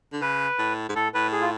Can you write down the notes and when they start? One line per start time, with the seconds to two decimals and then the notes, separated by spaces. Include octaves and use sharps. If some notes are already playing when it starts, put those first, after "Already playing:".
0.12 D3
0.21 C#3 B4
0.58 A2
0.89 G#2
0.95 A2 A4
1.14 A2 B4
1.32 G#4
1.41 F4